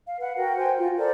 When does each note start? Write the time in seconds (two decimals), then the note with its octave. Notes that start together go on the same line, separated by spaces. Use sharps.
0.07 F5
0.19 B4 F#5
0.37 F#4 A#4 F#5 G5
0.57 C5 G5 G#5
0.78 F4
0.96 A4 A#4 C5 D5